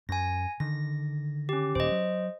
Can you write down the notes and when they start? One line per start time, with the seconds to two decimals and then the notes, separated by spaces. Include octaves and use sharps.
0.09 F#2 G#5 A#6
0.60 D3 D#3 A#6
1.49 C#4 G4
1.75 D#1 C5 D#5
1.92 F#3